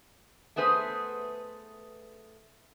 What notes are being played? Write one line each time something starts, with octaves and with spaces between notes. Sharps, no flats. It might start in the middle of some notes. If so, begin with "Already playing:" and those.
A3 B3 G#4 B4 C5